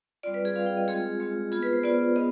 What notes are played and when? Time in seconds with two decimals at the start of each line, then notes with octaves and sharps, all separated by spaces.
0.23 G3 C4 F4 D5
0.34 B4
0.45 G#4
0.56 G3 C4 F4 F5
0.66 G5
0.77 D#5
0.88 G#3 C4 F4 G#4
1.20 G#3 C4 F4
1.52 B3 F4 G#4
1.63 B4
1.73 C5
1.84 B3 F4 D5
2.16 B3 D#5